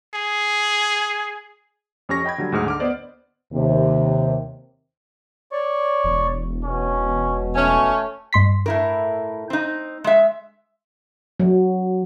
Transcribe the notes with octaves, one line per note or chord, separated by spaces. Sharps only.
G#4
F2 C#4 G4 C#5 C#6 A#6
D#5 G5 B5 G#6
D3 F#3 G3
D2 G#2 G#4 F6
D3 D6 F6
B3 C5 D5 D#5
D#2 C3
C#5 D5 C#6
E1
B2 C#4
A3 C#4
G2 C6 B6
A2 E4 A#4
C4 D#4
G#3 E5
F#3